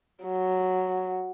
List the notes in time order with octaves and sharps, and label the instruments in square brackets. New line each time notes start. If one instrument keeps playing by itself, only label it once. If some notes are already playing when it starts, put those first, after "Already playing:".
[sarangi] F#3